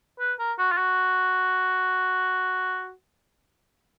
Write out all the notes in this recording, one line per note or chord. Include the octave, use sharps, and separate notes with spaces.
B4
A#4
F#4
F4
F#4